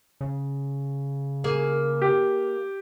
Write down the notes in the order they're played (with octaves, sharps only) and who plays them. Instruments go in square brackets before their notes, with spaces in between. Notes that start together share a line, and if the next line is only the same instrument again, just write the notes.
[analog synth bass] C#3
[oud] A#3 G#4
[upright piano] G4